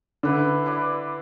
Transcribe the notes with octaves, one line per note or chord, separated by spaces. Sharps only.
D3 E4 B4 D5
E4 B4 D5